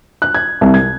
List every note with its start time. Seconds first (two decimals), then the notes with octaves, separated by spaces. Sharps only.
0.22 F#6
0.34 G#6
0.61 C2
0.74 G#6